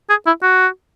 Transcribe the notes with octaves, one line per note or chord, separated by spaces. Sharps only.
G#4
E4
F#4